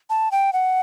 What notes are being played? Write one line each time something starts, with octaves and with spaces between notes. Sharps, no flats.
A5
G5
F#5